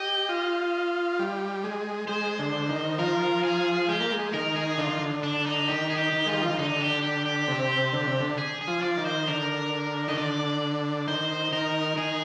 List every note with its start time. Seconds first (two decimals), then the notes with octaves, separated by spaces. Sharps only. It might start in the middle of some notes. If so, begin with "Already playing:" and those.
Already playing: G4 D#5
0.29 F4
1.19 G3
1.64 G#3
2.08 G#3 C5
2.39 D3
2.69 D#3
2.98 F3 A#4
3.43 G#4
3.88 G#3 G4
4.00 A#3
4.12 G#3
4.33 D#3 A#4
4.56 G#4
4.78 D3 F4
4.89 D#3
4.99 D3
5.23 D4
5.46 D#4
5.68 D#3 G4
5.90 G#4
5.98 G4
6.13 D#3
6.26 G#3 F4
6.34 G3
6.42 F3
6.50 D#3
6.58 D3 D#4
6.81 G4
7.03 G4
7.26 G4
7.48 C3
7.92 D3
8.07 C3
8.20 D3
8.38 G#4
8.61 G#4
8.67 F3
8.83 D5
8.97 D#3
9.06 C5
9.27 D3 A#4
10.08 D#3 D#5
10.17 D3 D5
11.07 D#3 C5
11.52 D#3 A#4
11.97 D#3 G#4